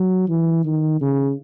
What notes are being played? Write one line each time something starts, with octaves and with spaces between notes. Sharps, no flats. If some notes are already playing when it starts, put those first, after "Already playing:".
Already playing: F#3
E3
D#3
C#3